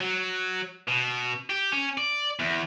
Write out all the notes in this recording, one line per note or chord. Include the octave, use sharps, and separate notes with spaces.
F#3
B2
G4
C#4
D5
E2